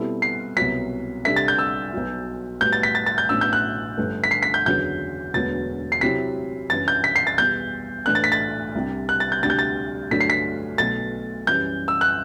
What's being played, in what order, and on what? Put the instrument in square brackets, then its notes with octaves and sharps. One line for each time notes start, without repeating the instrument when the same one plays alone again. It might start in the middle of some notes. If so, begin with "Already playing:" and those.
Already playing: [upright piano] B2 G3 C4 E4 A4
[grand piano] C7
[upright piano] C2 B2 F#3 [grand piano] B6
[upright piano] C3 G3 D4 A4 E5 [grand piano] B6
[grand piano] A6
G6
E6
[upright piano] B1 B2 F#3
[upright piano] A2 G3 B3 F#4 B4 [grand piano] G6
[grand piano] A6
B6
A6
A6
G6
[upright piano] A1 A2 F#3 B3 D4 [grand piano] E6
[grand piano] G6
F#6
[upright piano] G1 G2 D3 A3
[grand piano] B6
C7
B6
G6
[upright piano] F#1 E2 D3 F#3 [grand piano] G6
[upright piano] E1 D2 D3 F#3 B3 [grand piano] A6
[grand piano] C7
[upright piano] C3 F#3 C4 E4 G4 [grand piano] B6
[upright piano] G1 F#2 E3 [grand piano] A6
[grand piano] G6
B6
C7
A6
[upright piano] E2 B2 G3 [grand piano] G6
[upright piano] A2 E3 A3 D4 [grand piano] F#6
[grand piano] A6
B6
A6
[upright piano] C2 C3 G3 D4 G4
[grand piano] F#6
A6
G6
[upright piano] D2 C3 G3 D4 G4 [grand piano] A6
[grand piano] G6
A6
[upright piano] G2 D3 F#3 A3 D4 [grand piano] B6
[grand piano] C7
B6
[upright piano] B1 B2 A3 [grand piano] A6
[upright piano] F#2 E3 G3 [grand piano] G6
[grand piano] E6
F#6